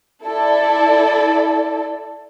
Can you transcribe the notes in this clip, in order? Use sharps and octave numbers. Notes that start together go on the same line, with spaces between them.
E4 A4 D5